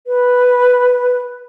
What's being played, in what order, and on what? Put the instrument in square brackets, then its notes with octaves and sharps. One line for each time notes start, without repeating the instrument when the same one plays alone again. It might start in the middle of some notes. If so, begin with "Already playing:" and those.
[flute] B4